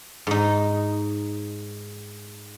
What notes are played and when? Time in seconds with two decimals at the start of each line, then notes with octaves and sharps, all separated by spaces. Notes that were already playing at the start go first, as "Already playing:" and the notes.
0.27 G#2 D#4